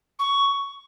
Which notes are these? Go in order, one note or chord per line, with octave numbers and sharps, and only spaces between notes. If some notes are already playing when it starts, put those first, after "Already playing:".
C#6